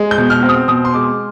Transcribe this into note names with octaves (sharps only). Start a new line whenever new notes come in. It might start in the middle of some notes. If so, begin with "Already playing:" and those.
Already playing: G#3
G6
B2
F6
C4
D#6
B2 D#6
C6
G#3 D6